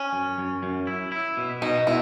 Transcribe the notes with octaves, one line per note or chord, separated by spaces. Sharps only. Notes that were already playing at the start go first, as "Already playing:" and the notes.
Already playing: C#4
F#2
F#2
F#2
E4
E4
B2
B2 D#4
B2 E4